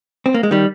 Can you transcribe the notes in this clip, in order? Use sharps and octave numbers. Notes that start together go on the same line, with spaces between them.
C4
A#3
G#3
D#3 G3